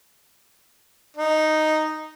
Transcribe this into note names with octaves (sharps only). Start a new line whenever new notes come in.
D#4